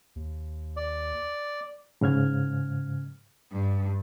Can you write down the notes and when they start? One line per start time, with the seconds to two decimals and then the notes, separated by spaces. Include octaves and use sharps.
0.16 D#2
0.77 D5
2.01 G#2 C#3 F6 G#6
3.52 G2